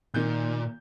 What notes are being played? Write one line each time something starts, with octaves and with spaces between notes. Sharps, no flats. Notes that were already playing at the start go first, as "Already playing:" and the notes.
A#2 D#3 G6